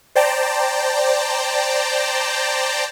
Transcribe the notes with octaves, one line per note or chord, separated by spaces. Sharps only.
C5 D5 G5 A5 A#5